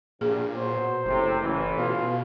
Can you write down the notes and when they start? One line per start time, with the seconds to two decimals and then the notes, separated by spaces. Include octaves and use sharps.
0.21 A#1 G2 A#2 G#4
0.55 B2 F#3 C5
1.06 F#1 A2 C3
1.41 A1 E3
1.78 B2 F4